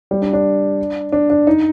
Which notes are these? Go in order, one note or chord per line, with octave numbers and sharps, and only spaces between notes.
G3
D4
D4
D4
D4
D#4